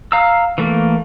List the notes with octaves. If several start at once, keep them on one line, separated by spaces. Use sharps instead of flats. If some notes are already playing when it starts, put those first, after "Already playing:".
F5 A#5 E6
E3 A3 A#3